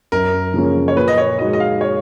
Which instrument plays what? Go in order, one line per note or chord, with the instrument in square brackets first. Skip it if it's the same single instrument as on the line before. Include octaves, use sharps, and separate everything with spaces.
[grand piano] F#2 [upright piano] A#4
[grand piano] C#3 F3 A#3 C#4
[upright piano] C#5
[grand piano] A#2 [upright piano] B4
[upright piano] D#5
C#5
[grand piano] G#3 D#4 F#4 [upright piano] D#5
[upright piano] D#5
F5
C#5